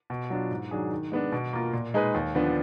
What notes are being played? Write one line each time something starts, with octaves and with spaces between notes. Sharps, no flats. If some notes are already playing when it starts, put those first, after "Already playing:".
B2
F#3 D4 F4
G#2
D#3 F#3 D4 G#4
D#3
G#3 B3 D4
B2
A#3 F4 A#4
A#2
G#3 D#4 G#4 B4
D#2
D3 F3 B3 D4